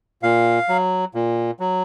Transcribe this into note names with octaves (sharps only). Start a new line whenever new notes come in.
A#2 F5
F#3
A#2
F#3